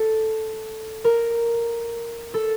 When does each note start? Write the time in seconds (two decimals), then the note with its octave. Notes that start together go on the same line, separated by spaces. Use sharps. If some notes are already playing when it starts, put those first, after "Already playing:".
Already playing: A4
1.04 A#4
2.34 A4